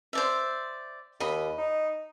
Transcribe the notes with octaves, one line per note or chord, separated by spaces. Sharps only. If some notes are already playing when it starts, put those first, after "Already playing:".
C5 D5 E5
D#2 D#5 B5
D#4